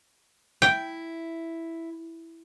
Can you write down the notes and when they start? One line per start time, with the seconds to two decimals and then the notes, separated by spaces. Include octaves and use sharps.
0.62 E4 G5